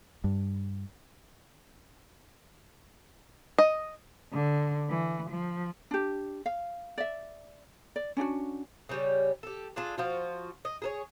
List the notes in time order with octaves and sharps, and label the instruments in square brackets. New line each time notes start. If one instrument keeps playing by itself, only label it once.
[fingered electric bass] G2
[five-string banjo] D#5
[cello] D3
E3
F3
[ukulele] D4 G4
F5
D5 E5
D5
C#4 D4 F4 F#4
[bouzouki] C#3 G3 C#4
G4 A4
D4 F4 G#4 A4
F3 F4 F#4
D#5
G#4 A4 C#5